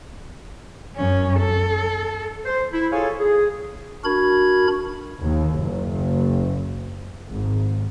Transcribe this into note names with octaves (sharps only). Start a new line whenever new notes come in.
F#2 C#4
A4
C5
E4
F4 G#4 A4 C#5 F5 G#5
G#4
D4 F#4 A#4 B5 G#6
D#2
F#1
G#1